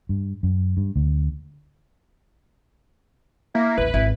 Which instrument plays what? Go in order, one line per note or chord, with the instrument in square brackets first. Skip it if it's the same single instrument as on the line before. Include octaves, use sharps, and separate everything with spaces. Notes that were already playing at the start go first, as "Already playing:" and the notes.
[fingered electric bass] G2
F#2
G2
D2
[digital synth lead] A#3 [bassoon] E4
[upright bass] A1 D#2 [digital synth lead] B4
[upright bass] G#1 [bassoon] E4